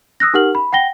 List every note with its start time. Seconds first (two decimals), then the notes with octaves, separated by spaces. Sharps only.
0.20 D#6 E6 F#6 A#6
0.34 D#4 G4 A#4 F#5 F6 F#7
0.55 B5
0.73 F#5 G5 A#6 G7